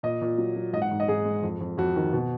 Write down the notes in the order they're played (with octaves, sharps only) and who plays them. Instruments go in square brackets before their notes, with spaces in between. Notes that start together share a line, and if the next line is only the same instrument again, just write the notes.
[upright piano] A#2 D#5
A#2
F#3
F#3
G#2 D#5
F#5
G#2
D#5
G#2 G#4
G#3
F2
F2
F2 F#4
D#3
B2